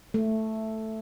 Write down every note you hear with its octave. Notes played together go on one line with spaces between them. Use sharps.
A3